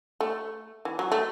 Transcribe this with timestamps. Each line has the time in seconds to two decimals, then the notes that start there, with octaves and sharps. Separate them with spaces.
0.20 A3
0.85 E3
0.99 F#3
1.12 A3